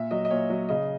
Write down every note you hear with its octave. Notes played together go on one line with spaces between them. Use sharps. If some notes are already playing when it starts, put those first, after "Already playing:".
Already playing: A#2 E5
F#3 D#5
D#5
A#2 C#5
F#3
C#3 D#5